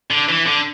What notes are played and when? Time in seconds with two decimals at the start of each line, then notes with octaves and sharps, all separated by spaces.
0.10 D3
0.29 E3
0.46 D3